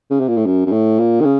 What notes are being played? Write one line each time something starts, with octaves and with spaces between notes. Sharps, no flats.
C#3
C3
A#2
A2
F#2
F#2
A2
A#2
D#3
C#3